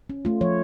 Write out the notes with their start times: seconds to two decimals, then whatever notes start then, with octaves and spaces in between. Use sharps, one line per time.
0.10 C#4
0.25 A3 F4
0.41 F3 C#5